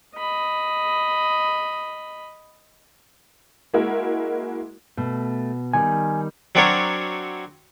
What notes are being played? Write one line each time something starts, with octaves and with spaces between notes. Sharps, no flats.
D#5 B5
G#3 A#3 E4 F#4 A#4
B2 A3
D#3 G3 G#5
F#3 C4 D4 F#4 A#4 C#5